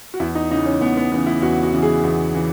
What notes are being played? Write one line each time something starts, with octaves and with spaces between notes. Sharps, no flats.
F#4
E2 E4
D#4
C#3 E3 D#4
C#4
E2 B3
B3
C#3 E3 B3
E4
E2 F#4
F#4
C#3 E3
G#4
E2
C#3 E3